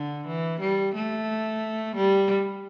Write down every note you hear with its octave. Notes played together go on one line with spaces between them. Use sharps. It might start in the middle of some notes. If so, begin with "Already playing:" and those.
Already playing: D3
E3
G3
A3
G3